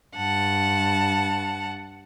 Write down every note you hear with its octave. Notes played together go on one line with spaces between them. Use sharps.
G2 F#5 A5